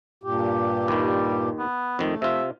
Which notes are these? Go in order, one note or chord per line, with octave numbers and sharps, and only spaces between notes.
G2 A#2 G4
D#2 D#3 G3
B3
F2 D#3 A3
C3 F4 E5